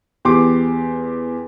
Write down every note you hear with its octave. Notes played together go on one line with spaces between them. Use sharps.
E2 G4 C6 D6